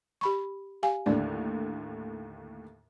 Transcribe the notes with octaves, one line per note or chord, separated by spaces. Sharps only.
G4 B5 C#6
G4 F5 G#5
D#2 A2 D3 D5